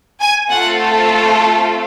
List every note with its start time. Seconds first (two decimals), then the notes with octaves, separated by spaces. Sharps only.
0.20 G#5
0.50 A3 C4 F4 A4 F#5